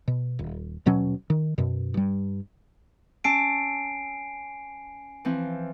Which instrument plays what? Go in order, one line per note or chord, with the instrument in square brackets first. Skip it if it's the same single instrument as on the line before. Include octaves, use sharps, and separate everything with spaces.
[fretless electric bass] B2
D#1
D#1 B2 F#3 C#4
D#3
F#2 B2
G2 G3
[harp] C#4 A5 E6 [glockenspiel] G#5 C7 D7
[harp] E3 F3 C4